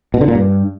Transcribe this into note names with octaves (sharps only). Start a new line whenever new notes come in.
B2
D3
A#2
G2